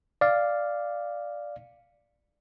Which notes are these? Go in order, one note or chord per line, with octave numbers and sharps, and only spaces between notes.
D5 F5